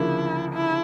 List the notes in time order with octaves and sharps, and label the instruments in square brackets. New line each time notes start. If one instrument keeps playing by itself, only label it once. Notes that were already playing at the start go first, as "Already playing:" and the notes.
Already playing: [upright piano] D2 C#3 F3 A#3 [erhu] E4
[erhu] E4